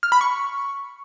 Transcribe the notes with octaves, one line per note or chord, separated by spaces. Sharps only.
F6
B5
C#6